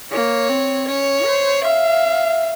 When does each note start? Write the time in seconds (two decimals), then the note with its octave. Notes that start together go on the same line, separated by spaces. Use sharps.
0.11 A#3 C#5
0.49 C4
0.87 C#4 C#5
1.26 C5
1.64 E5 F5